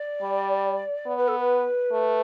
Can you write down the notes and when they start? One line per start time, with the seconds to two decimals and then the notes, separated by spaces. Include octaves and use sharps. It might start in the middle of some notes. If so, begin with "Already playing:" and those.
Already playing: D5
0.22 G3
1.06 B3
1.17 B4
1.28 A4
1.38 B4
1.92 A3